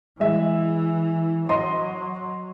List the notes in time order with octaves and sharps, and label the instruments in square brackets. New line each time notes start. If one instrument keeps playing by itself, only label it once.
[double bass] E3 [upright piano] G#3 E5
[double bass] F#3 [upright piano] D#5 C6